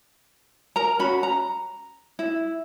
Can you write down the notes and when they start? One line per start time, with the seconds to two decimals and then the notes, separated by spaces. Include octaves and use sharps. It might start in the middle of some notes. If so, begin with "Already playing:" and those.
0.76 A#4 A#5
0.99 C#4 F#4 B5
1.23 A#5
2.19 E4